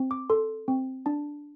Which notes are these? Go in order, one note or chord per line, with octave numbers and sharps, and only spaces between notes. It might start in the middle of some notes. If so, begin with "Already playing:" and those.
Already playing: C4
D6
A4 C6
C4
D4 A5